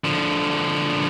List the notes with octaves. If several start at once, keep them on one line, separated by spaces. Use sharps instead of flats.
D3 F3